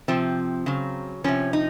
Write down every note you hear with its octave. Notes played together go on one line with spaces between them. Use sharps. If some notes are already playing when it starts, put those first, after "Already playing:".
C3 F3 C4
C#3 F#3
C3 F3 C#4
D#4